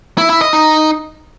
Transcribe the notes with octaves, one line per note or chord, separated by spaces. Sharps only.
E4
E4
D#5
D#4